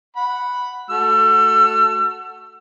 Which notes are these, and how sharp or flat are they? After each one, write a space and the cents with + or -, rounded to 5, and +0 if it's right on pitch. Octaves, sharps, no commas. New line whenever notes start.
F#5 +0 B5 +0
A3 +0 F#4 +0 E6 +35